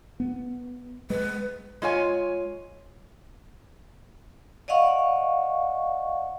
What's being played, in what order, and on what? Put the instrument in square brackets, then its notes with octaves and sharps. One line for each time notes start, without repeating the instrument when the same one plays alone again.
[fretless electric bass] B3
[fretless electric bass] G#3 [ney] B4
[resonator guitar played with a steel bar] G#3 F4 C#5 G#5
[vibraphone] D5 D#5 F5 F#5 C#6